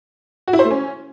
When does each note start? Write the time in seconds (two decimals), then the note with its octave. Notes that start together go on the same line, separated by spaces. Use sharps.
0.48 F#4
0.53 E4
0.59 C5
0.65 A3
0.71 C#4